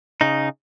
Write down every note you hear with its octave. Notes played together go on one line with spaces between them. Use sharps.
C#3 D#4